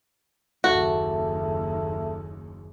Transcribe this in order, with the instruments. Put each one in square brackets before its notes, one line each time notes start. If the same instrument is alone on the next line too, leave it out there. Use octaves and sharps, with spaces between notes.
[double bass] F#1 D#2 [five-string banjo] F#4 [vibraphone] A4 E5 A5